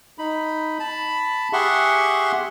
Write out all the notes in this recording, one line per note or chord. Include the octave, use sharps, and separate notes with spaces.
D#4 B5
A5 B5
G4 G#4 E5 F#5 C6 C#6